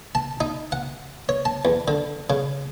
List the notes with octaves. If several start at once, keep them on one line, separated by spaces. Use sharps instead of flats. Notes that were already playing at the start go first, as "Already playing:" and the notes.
A5
D#4
F#5
C#5
A5
E2
D3
C#3